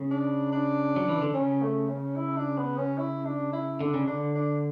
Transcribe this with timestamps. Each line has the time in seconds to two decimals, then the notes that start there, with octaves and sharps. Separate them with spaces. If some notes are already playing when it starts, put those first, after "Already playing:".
Already playing: C#3
0.11 D4
0.52 D4
0.96 F#3
1.08 E3
1.21 D3
1.34 C#3 C#4
1.61 A3
1.89 C#4
2.16 E4
2.37 D4
2.58 B3
2.78 C#4
2.98 E4
3.25 D4
3.53 E4
3.80 D3 D4
3.94 C#3
4.07 D3 D4
4.35 D4